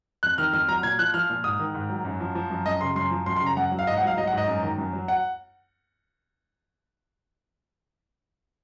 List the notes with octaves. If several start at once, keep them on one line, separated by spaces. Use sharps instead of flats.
F2 F#6
D#3 F6
F2 F6
F#3 A#5
A#2 G#6
F3 F#6
F3 F6
A#2
G#2 D#6
D#3
G#2
F#3
F#2
F3
F3
F#2
F#2 D#5
C#3 C6
F#2 C6
F3
F#2 C6
C6
C#3
A#5
F#2 F#5
F#3
F5
G#2 D#5
F#5
F#3 F5
F#3 D#5
F#5
G#2
D#5
F#2
D#3
F#2
F#3
F#5